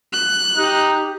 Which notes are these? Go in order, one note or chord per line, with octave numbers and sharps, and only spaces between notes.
F#6
D#4 G4